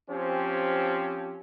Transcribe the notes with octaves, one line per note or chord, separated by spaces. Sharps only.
F3 C4 C#4 G4